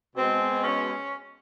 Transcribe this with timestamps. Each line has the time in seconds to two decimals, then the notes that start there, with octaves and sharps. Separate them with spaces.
0.16 B2 G#3 C4
0.64 C#4